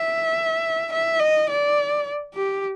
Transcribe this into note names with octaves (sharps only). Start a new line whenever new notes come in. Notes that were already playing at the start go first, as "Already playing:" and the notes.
Already playing: E5
E5
D#5
D5
G4